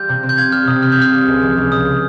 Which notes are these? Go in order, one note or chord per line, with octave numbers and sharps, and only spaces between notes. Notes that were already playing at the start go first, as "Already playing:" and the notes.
Already playing: G3 F4 G6
C3
C4
G6
F4 G#6
G3 F6
C3 D#6
C4 F6
G6
F4 F6
G3
C#2
F3
C#2
C#3 D#6